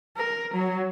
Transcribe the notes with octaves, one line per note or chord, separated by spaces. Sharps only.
A#4
F#3